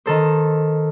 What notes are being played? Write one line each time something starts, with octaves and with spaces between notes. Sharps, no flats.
D#3 A4 C5